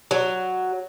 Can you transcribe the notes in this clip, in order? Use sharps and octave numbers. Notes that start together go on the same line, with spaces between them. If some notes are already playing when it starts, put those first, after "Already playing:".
F#3